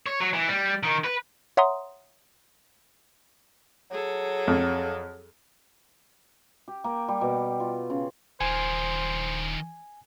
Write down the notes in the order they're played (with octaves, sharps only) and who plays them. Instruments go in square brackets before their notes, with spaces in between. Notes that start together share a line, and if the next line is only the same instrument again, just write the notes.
[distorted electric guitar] C#5
F#3
E3
G3
D#3
B4
[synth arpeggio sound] C#5 E5 F#5 A#5 C6 D#6
[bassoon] F#3 [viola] G#4 A4
[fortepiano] F2
[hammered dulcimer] G4
A#3
G3
B2
F4
C#3
[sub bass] D#1 [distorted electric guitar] D#3 F3 [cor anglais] C5 [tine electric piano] G#5